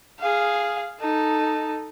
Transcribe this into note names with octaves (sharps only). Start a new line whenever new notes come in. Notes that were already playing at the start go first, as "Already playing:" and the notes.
G#4 F5
D#4 A4